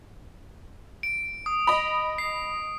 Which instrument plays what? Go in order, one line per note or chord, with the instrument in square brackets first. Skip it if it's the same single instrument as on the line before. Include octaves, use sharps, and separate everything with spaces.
[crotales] D7
D#6
[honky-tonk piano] D#5 B5
[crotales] C7